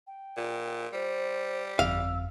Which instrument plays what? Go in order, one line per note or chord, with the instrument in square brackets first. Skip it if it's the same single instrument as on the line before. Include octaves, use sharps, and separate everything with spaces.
[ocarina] G5
[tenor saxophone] A#2
[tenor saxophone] G3 [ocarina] C5
[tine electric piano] G1 F2 [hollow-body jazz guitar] F5 [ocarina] E6